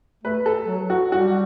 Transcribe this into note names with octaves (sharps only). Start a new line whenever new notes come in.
A3 B4
A4
F#3
F#4
G3 F#4